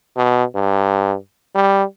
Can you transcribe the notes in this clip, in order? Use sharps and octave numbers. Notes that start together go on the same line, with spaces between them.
B2
G2
G3